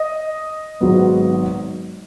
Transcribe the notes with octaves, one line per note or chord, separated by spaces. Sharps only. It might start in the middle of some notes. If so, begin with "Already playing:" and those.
Already playing: D#5
G#1 G#2 F#3 B3